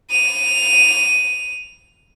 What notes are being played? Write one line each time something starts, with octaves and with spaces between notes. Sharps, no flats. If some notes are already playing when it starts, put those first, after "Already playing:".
D#7 F7